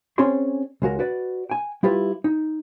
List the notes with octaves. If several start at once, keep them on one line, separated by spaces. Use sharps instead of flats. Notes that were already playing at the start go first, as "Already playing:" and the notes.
C4 C#4 G#4 C#5 D5 C6
C#2 G#3 F#4 A#4
F#4 B4 D5
G5 G#5
G3 E4 F4 G4 B4
D#4